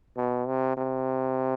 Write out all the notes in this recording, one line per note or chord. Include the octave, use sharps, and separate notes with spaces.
B2
C3
C3